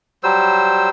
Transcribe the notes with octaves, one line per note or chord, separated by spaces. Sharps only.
F#3 G3 C5 E6